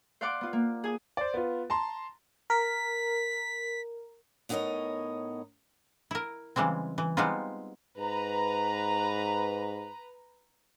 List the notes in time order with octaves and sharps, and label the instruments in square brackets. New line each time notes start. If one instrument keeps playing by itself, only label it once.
[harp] C5 D5 F5 F#5 C6 D6
B3 F4
A#3
G#4 G#5 D#6
[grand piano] C5 D5
B3 F4
A5 A#5 C6
[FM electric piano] A#4 [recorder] B6
[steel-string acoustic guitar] A2 B3 D#4 A#4 C#5 D#5
[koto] E4 A#4
C#3 E3 G3 G#3 C4
E3
G3 G#3 B3 C4 D#4 F4
[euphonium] G#2 [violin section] B4 A#5